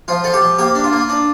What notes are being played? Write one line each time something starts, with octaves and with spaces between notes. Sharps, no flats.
F3 F4
F3 A4
G4
F3
A#3 G4
D4
F4
A#3
D4